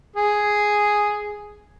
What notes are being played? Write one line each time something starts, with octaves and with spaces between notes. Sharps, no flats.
G#4